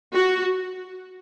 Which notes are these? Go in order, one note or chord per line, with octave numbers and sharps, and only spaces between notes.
F#4